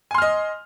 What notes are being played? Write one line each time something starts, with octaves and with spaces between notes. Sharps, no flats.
D#5 G#5 C6 F6